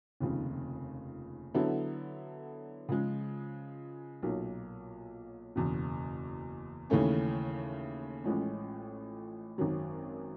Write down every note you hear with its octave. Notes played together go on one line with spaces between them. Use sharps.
F1 D#2 C#3 F3
D3 F#3 B3 E4 A4
C#3 F3 G#3
B1 A#2 F#3
F#1 E2 B2
D#2 C#3 E3 A3 C#4
A1 A2 F3 G#3 C#4
G#1 F#2 D#3 F#3